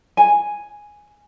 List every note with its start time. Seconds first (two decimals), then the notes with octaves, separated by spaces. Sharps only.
0.17 G#5